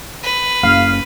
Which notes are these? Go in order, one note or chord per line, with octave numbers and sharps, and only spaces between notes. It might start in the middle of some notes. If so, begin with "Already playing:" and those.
B4
F#1 F5